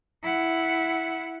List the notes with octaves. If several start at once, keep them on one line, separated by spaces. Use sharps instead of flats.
E4 F#5